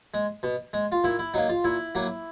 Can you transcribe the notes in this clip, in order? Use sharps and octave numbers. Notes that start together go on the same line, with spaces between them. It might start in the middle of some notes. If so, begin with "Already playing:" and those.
G#3
B2
G#3
F4
A#2 E4
E4
F#3 A#3 D#4
F4
A#2 E4
F#3 A#3